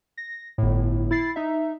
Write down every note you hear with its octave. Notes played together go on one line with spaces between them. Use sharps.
A#6
G1 A2
E4 A6 C7
D#4 E5